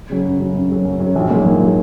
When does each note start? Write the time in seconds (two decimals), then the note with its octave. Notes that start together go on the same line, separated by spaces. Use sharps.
0.10 C#3 F#3
0.24 F#2
0.39 C#3 F#3
0.55 F#2
0.70 C#3 F#3
0.85 F#2
1.00 C#3 F#3
1.15 A#1
1.30 G#2 F#3 A#3
1.45 A#1
1.60 F#3 A#3